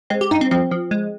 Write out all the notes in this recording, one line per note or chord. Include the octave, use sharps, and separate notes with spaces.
G#3 C4
G4
G2 D#4
C4
F3 C4
F3
G#3